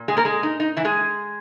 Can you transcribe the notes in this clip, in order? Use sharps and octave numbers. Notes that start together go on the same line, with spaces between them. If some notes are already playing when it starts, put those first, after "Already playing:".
Already playing: A#2
G#3 G#4
A#3 A#4
G#3 G#4
D#4
D#4
E3 E4
G#3 G#4